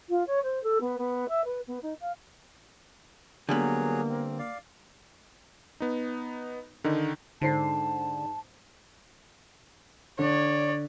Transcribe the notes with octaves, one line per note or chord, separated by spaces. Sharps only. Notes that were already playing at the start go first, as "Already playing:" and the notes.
F4
C#5
C5
A4
B3
B3
E5
B4
B3
D#4
F5
D3 F#3 G3 A#3 B3 G#4
C4
D5 F5
B3 D#4
D3 D#3 D#4
G#2 D3 C5 A5 C7
D3 C#5 D5